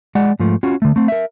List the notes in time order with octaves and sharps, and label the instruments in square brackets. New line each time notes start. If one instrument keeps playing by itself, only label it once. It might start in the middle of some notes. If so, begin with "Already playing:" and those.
[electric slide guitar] G#3 D5 F#5
G#2 F3 A3
C#4 F4 F#4
D3 A3
A3 C4
A#4 E5